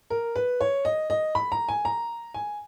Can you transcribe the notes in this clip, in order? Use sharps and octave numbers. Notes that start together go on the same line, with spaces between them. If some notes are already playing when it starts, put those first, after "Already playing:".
A#4
B4
C#5
D#5
D#5
B5
A#5
G#5
A#5
G#5